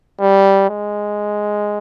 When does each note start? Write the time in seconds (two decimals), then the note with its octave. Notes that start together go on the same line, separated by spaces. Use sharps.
0.21 G3
0.69 G#3